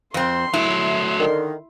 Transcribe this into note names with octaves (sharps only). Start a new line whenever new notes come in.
F2 C4 C6
F#3 A3 E4
D3 D#3